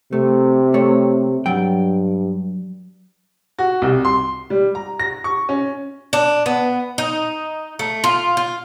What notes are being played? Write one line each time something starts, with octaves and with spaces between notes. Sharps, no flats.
C3 A3
A3 C#5
G2 F#3 G5
F#4
C2
C6
G3
A#5
A#6
C#6
C#4
D4
B3
D#4
A3
F4
F4